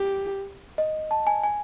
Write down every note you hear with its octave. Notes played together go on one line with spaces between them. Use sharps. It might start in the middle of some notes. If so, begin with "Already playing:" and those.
Already playing: G4
D#5
A5
G#5
G#5